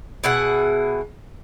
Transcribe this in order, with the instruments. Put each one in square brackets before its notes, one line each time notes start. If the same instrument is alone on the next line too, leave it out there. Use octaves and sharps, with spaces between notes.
[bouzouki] B2 E4 G#4 F#5